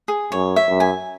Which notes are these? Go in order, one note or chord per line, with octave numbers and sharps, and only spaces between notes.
G#4
F#2 C#5
E5
F#2
G#5